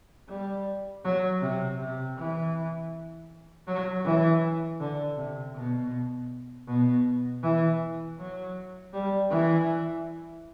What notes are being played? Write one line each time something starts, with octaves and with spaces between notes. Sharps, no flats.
G3
F#3
C3
C3
E3
F#3
E3
D3
C3
B2
B2
E3
F#3
G3
E3